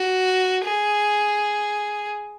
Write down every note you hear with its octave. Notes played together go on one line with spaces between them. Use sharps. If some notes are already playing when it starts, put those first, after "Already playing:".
Already playing: F#4
G#4